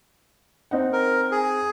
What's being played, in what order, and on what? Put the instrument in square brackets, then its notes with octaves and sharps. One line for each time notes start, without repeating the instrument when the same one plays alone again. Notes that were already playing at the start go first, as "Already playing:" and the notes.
[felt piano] C4 D#4 F#5
[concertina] A#4
G#4